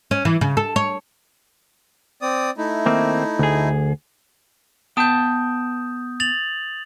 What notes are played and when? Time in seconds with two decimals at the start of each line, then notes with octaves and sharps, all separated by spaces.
0.11 C#4
0.25 E3
0.41 C#3
0.57 A4
0.76 C#5
2.22 C4 D5 D#6
2.57 A3 D#4 E4
2.86 D#3 A#3 C4
3.39 D2 G#4
4.97 B3 G5 A5 D#6 G6
6.20 A6 F7 F#7